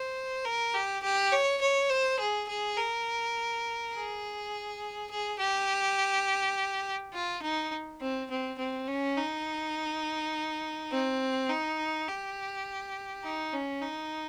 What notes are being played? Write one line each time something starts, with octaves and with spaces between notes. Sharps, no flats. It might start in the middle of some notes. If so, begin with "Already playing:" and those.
Already playing: C5
A#4
G4
G4
C#5
C#5
C5
G#4
G#4
A#4
G#4
G#4
G4
F4
D#4
C4
C4
C4
C#4
D#4
C4
D#4
G4
D#4
C#4
D#4